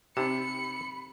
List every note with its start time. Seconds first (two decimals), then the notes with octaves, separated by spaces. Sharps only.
0.17 C3 C4 D#4 G4 B5 C#7